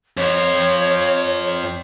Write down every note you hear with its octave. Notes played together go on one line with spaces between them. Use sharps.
F2 F3 C#5